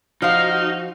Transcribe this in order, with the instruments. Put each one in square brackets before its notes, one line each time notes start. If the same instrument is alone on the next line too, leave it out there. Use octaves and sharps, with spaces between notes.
[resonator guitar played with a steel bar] F3 F5 [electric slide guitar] D#4 [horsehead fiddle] F#4 [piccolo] F6